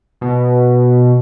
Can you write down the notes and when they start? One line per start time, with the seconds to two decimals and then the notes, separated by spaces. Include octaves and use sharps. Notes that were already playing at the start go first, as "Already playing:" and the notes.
0.21 B2